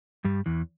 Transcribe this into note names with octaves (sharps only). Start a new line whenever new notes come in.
G2 G3
E2 E3